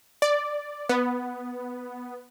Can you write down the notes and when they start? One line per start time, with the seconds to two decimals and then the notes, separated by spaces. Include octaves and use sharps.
0.22 D5
0.89 B3